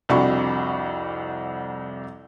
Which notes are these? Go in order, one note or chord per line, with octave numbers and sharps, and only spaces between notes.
C2 F2 D4 F#4 B5 C#6